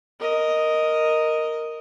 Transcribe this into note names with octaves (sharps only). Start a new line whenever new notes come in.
A#4 D#5